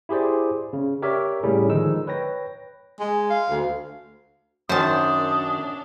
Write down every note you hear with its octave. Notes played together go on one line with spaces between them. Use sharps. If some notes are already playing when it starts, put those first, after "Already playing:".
E4 G4 G#4 C5 D5
C#3
G4 A#4 C#5 D5 E5
A2 C#3 G3 C#4 G#4
D3 D#3 F3 G#3 D#4 E6
B4 C#5 G5 A#6
G#3
F5
D2
F#2 D#3 C#4 D4 C5 A5 D#6